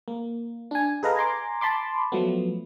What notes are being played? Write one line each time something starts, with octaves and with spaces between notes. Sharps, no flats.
A#3
D4 G#5
G#4 A4 B4 D#5 F5 A#5
G#5 A#5 C6 D6
A5 B5 C6 D6
F3 F#3 A3 B3